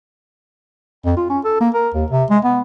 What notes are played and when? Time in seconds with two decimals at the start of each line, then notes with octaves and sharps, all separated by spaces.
1.06 F2
1.17 F4
1.30 C#4
1.45 A4
1.60 A#3
1.74 A#4
1.94 D#2
2.10 C3
2.30 G#3
2.44 B3